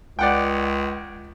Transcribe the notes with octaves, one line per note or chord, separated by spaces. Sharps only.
C#2 D5 F#5 G5